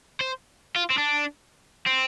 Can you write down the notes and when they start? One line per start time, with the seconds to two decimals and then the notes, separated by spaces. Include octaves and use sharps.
0.21 C5
0.76 F4
0.91 C4
0.98 D4
1.86 C4